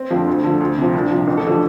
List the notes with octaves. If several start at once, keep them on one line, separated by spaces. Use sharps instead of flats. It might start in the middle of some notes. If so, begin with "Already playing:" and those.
Already playing: C4
F2 D3 F3
D2
D3 F3
D2
C3 F3 C4
C2 D4
C3 F3
A1
A4
D3 F3 G4